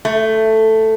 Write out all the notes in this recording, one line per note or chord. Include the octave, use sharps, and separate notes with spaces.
A3